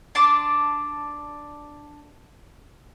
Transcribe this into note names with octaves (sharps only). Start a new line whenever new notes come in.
D4 A5 C6 D6